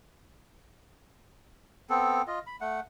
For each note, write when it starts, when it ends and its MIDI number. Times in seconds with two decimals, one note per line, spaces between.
1.90 2.22 59
1.90 2.22 60
1.90 2.22 69
2.27 2.39 65
2.27 2.39 75
2.46 2.56 83
2.61 2.80 57
2.61 2.80 78